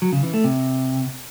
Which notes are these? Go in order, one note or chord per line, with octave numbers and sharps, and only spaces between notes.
F#3
C#3
E3
A3
C3